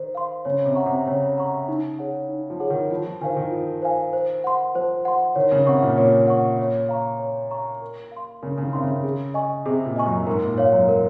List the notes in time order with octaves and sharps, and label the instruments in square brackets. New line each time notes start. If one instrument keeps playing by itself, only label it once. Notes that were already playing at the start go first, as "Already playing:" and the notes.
Already playing: [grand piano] D#3 [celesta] C5
[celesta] F5 C6
[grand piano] C#3 [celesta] C#5
[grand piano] C3
[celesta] F#5 A#5 C#6
[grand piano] C3
[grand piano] C#3 [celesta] C#5
[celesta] F#5 A#5 C#6
D#4
G#4 C#5 F#5
D#4
[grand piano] F3
[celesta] G#4 C#5 F#5
[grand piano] D#3
[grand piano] F3 [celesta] F4
[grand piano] F3
[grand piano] D#3 [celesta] C5 F5 G#5
[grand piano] D#3
[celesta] F4
C5 F5 G#5
C5
F#5 C6
[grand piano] F3 [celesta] C5
[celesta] F#5 C6
[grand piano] D#3 [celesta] C#5
[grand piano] C#3
[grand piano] C3 [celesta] F#5 C#6
[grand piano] A#2
[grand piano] A#2 [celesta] C#5
[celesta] F#5 C#6
C#5
F5 A#5 C#6
C#5
F5 A#5 C#6
A#4
F5
C6
[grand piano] C#3 [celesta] A#4
[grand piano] C#3
D#3
[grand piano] C3 [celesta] F5 C6
[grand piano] C#3
[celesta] G#4
D#5 G#5 C#6
[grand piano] C3 [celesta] G#4
[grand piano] A#2
[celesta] D#5 G#5 C#6
[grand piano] F#2
[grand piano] G#2 [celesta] A#4
[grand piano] A#2
[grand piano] G#2 [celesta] C#5 F5
[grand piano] F#2
[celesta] A#4